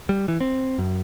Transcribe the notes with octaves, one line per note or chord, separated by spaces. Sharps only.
G3
E3
C4
F#2